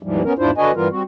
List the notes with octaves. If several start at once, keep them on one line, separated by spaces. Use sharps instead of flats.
D#2 G#2 E3 F3 G3
B3 C#4 A#4
E2 G#2 D4 E4 F4 C5
D3 D4 F#4 B4 D#5 G#5
G2 E3 G3 B3 F4 A#4
G3 C4 F#4